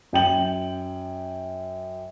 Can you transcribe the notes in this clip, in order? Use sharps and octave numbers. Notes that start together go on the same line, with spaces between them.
F#2 G5 F#7